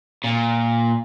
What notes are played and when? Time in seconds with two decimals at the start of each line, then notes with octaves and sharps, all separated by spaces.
0.24 A#2